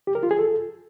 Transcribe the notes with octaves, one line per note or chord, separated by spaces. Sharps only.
G4
A#4
F4
G#4
A4